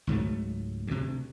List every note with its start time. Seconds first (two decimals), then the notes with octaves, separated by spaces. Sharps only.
0.07 C#2 G#2 F#3 A3
0.87 D2 C3